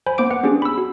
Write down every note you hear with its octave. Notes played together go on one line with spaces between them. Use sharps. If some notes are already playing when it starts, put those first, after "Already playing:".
C5 G#5 B5
A#3 B3 C5 D6 D7
B4 F#5
B3 C#4 D4 G4 G#4
B5 E6
F#4